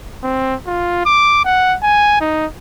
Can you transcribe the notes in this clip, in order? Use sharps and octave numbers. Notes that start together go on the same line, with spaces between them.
C4
F4
D6
F#5
G#5
D#4